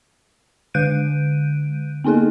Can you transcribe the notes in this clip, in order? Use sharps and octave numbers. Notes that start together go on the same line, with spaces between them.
D3 G#3 F#6 G6 D7 D#7
A#3 B3 D#4 G#4 A4